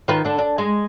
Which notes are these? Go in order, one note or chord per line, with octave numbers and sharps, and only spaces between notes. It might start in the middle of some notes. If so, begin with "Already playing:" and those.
D#3 F4 B4
D3 D4
D4
G#3